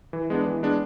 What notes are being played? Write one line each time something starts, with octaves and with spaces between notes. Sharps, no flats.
E3
G#3 B3 D4
E3
G#3 B3 D4